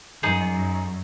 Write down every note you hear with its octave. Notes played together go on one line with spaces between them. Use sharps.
F#2 D#4 G#4